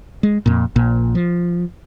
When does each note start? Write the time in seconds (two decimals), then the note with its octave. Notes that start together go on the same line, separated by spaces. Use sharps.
0.23 G#3
0.46 F2 A#2
0.76 A#1 A#2
1.15 F3